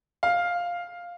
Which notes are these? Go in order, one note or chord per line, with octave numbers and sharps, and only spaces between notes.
F5